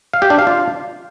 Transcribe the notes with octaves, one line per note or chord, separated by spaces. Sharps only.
F5
G4
D4
F5
F4